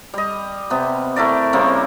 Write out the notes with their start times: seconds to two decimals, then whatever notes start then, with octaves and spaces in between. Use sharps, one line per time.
0.14 G3 D#5
0.70 C3 B3
1.16 A3 E4 A#4 D5
1.53 C#3 G3 A#3 C4